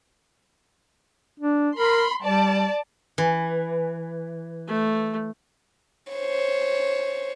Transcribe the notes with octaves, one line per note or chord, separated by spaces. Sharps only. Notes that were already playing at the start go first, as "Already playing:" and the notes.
D4
A#4 B5 C6
G3 D5 A5
E3
A3
C5 C#5